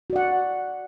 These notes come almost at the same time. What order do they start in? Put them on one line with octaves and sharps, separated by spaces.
F#4 D5 F#5